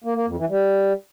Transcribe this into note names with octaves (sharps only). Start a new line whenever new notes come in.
A#3
A#3
F2
E3
G3